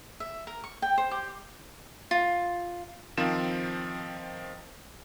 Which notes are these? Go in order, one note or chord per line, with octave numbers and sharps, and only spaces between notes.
E5
A#4
C#6
G5
C5
G4
F4
D#3 F3 C4 F4 E7